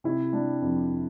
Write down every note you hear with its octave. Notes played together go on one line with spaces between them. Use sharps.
C3 E4
G3 D4
F2